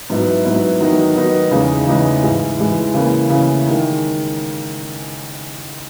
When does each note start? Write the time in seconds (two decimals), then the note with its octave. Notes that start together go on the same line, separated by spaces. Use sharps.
0.10 G#2 F#3 B3 E4
0.45 G#2 F#3 B3 E4
0.80 D#3 F#3 B3 D#4
1.15 D#3 F#3 B3 D#4
1.51 E2 C#3 E3 G#3 D#4
1.86 E2 C#3 E3 G#3 D#4
2.22 G#2 E3 G#3
2.58 G#2 E3 G#3
2.94 C#3 E3 A#3
3.30 C#3 E3 A#3
3.67 D#3 G#3